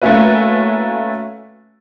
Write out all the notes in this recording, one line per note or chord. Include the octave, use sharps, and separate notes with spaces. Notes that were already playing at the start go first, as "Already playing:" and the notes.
A3 A#3 C#4 E4 F#4 B4